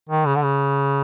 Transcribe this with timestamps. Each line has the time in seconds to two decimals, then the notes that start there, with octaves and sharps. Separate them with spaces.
0.09 D#3
0.26 C#3
0.35 D3
0.43 C#3